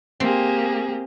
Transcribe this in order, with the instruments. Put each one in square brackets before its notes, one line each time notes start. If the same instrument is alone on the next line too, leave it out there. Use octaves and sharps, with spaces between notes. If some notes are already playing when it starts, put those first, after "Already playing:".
[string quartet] A#3 G4 G#4 [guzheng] C4